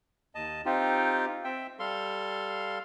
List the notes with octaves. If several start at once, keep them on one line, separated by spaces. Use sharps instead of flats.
D#2 D#5 A5
C4 D#4 F4 G4
C4 E5 G5
G3 A4 F5 C6